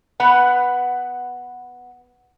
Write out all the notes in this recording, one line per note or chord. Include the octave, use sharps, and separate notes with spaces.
B3 B4 F#5